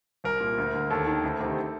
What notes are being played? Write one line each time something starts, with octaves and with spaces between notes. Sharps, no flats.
C2 A#4
A#2
D2
D3
D#2 A4
D#3
D2
C3 D#3